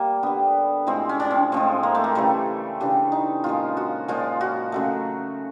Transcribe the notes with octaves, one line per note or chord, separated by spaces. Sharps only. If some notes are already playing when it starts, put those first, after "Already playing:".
Already playing: G3 A#3
D3 G3 B3
A2 F3 G#3 C4
C#4
C#4
C4
A2 F3 G#3 C4
A#3
A3
A#3
C#3 E3 G3 A3
C#3 E3 G3 D4
D#4
A#2 F3 G#3 F4
F#4
A#2 F3 G#3 F4
F#4
C#3 F#3 A3